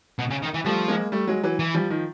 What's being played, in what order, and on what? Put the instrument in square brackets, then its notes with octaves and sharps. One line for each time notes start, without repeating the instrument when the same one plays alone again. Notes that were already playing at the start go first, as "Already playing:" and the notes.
[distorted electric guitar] B2
C#3
D#3
E3
[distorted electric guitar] F3 [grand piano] G3 A3
[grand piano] G#3 A#3
G3 A3
F#3 G#3
E3 F#3
[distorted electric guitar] E3
[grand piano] F3 G3
D#3 F3